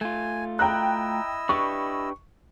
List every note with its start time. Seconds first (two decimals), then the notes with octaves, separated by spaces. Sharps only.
0.01 A3 F4 G#5
0.59 E4 D#5 G5 A#5 E6 F#6
1.49 D4 G4 B4 C#6